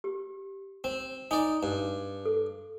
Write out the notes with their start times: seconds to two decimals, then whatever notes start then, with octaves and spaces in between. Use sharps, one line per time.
0.04 G4
0.84 C4
1.31 D#4 D5 G#5
1.63 G2
2.25 A4